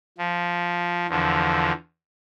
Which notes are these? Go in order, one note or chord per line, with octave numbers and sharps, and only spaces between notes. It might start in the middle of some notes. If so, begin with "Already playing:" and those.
F3
E2 D3 F3